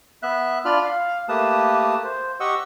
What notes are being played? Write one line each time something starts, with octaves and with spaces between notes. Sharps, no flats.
B3 E5 F#6
D4 F4 D5 B5 F6
F5
A3 A#3 G4 B4 A5 D#6
C5
G4 D#5 F#5 C#6 D#6 E6